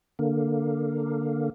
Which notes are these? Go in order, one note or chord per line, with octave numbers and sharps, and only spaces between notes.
D3 A#3